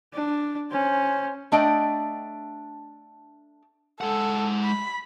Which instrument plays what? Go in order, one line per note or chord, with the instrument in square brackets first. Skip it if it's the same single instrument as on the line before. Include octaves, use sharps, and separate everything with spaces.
[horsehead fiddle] D4
C#4 C5
[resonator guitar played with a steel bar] A3 D4 D#5 G5
[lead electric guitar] G#3 F#5 [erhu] A4
[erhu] B5